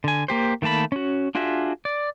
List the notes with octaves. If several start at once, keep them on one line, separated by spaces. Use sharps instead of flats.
D3 G#5
A#3 G4 C5
D#3 A3 A#3 A5 B5
C#4 F#4
D4 F4 F#4 G#4 E5
D5